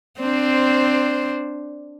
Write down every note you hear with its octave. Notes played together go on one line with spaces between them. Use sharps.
C4 D4 C5